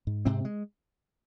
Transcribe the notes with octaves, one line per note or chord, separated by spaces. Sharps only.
G#2
G#2 C3 C4
G#3